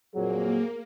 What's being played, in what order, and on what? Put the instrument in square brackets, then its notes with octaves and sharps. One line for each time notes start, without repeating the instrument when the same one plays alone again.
[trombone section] F2 A#2 F#3 [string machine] A#3 [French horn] G#4